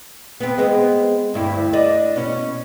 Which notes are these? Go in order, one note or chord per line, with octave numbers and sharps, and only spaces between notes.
B3 C4
G#3 B3 C4
D2 G2 E4
D4 D5 D#5
B2 C#4